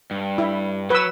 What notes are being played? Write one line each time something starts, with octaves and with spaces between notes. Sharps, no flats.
G2
E4
F#3 B4 E6